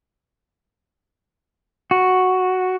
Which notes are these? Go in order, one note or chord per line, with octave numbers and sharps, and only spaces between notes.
F#4